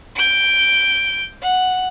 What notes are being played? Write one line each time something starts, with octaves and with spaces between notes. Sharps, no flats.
G6 D7
F#5